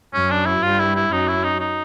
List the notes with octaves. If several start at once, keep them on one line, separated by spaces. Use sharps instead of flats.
F#2 F#3 C#4
D4
E4
G2 G3 F4
E4
E4
F#2 F#3 D#4
E4
D#4
D#4